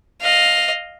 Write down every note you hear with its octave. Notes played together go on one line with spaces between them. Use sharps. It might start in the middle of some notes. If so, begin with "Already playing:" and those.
D#5 F5